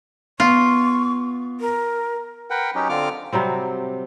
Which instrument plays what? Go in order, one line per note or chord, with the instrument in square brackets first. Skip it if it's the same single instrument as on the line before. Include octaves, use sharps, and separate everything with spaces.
[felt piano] B3 [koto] F4 [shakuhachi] C#6
[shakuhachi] A#4
[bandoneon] A#4 B4 F#5 G5
F#3 C#4 D#4 G4
D3 C4 F4 D6 F6
[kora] C3 F#3 G3 C4